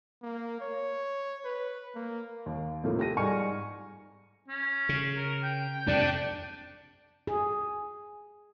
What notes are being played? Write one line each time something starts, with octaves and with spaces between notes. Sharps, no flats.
A#3
C#5
B4
A#3
D#2
A2 C3 F3 A3 A#3
G4 A4 A#6 D#7
G#2 G3 G#5 C#6 F6 C#7
C#4
C#3
A#4
G5
F2 C3 D4
G#4